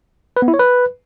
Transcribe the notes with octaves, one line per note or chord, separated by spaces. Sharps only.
B4
B3
E4
C#5
B4